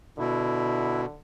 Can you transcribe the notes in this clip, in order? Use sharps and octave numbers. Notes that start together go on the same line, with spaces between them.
B2 D3 E4